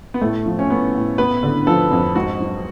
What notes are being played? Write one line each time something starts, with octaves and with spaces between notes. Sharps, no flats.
B3
A2 A3
F3
C#4
A3 B3
A2
B3 B4
D3
F3 A4
F2
G#2 F#4
F#3